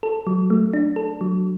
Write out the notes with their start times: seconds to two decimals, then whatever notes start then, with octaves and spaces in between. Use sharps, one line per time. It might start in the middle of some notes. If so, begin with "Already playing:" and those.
0.03 A4
0.27 F#3
0.50 A3
0.73 D4
0.96 A4
1.21 F#3